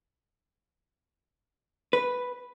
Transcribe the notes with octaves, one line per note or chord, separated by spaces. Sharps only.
B4